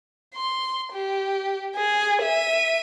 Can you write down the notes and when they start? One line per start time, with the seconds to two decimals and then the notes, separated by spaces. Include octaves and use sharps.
0.35 C6
0.93 G4
1.76 G#4
2.22 E5 D#7